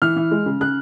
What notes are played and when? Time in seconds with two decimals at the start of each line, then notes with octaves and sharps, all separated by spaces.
0.02 E3 F6
0.16 E3
0.31 G#3
0.46 C#3
0.61 C#3 F#6